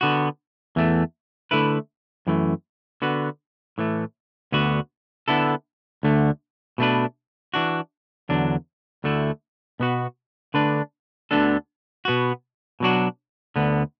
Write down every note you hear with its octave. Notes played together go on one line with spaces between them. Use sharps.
D3 B3 F#4
E2 E3 A3
D3 A3 E4 B4
F#2 E3 A3
D3 B3 F#4 B4
A2 E3 A3
D2 D3 B3 F#4
D3 B3 E4 A4
D2 D3 A3
B2 A3 D4 B4
E3 D4 F#4
E2 D3 F#3 D4
D2 D3 A3 E4
B2 B3 F#4 B4
D3 A3 D4 B4
D2 D3 B3 D4 A4
B2 B3 F#4
B2 F#3 D4 F#4
D2 D3 B3